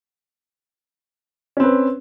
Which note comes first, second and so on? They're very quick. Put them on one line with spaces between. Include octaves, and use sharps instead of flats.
C#4 C4 B4